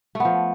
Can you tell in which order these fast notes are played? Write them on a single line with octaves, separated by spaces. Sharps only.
A3 B3 F3